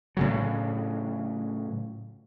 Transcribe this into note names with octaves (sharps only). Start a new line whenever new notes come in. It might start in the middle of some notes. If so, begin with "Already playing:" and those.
A2 C#3 F#3